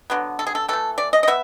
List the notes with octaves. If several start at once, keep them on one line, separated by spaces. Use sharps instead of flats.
D3 F#3 B3
A4
G#4
A4
E3 A3 A4
D5
D#5
D#5
B3 E5